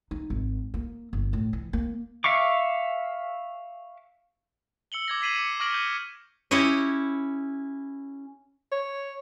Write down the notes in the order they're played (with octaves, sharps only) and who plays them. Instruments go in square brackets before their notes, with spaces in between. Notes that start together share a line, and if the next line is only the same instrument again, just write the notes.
[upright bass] D#4
G#1
A#3
G1
A2
E3
A#3
[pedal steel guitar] E5 F5 C#6 D6
[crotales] E6 C#7 F#7 G7
D6 G#6 A#6
G#6 B6 C7 D#7 E7 F#7
D6 C#7
C#6 D6 F6 A#6 D7 F#7
G6
[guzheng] C#4 E4 G4 C#5 D#5
[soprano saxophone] C#5